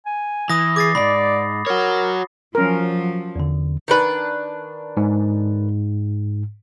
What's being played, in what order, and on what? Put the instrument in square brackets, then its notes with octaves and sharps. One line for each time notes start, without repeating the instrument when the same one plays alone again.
[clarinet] G#5
[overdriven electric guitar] E3 [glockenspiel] D#6 A#6
[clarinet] G#4 [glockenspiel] D6 A6 C7
[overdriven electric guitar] C2 G#2 [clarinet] D5 [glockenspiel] B5
[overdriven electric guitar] F#4 C#5 [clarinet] A#4
[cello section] F3 F#3 [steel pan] C#4 A#4
[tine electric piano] E2 D3
[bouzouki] D#3 D4 B4
[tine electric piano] G#2